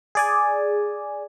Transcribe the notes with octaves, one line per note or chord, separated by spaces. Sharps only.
G#4 D5 G#5